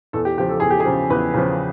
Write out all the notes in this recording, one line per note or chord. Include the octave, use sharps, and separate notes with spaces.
E2 A4
G4
C#3 F3 G4
A4
E2 G#4
G4
G#4
C#3 F3
E2 B4
C#3 F3